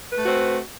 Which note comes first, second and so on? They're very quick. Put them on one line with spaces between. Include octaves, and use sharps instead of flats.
B4 A3 F#4 C4